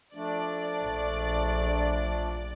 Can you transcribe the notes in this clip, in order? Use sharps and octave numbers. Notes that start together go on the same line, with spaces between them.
F3 A3 D4 D5
A#1